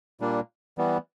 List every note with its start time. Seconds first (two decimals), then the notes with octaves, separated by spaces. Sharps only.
0.21 A#2 G3 A#3 D4
0.78 E3 G3 B3